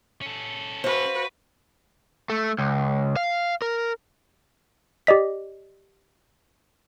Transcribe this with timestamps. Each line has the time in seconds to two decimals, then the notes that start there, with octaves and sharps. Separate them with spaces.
0.22 C#4 A4
0.84 F#4 B4 C5 F5
2.30 A3
2.59 C#2
3.16 F5
3.62 A#4
5.07 G4 D5 D#5 B6